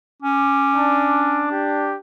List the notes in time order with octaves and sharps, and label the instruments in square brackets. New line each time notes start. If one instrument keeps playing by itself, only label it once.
[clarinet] C#4 [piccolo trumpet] D6
[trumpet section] D4
[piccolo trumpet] G4